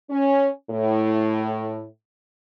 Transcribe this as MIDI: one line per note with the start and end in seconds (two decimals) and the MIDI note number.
0.10 0.48 61
0.71 1.82 45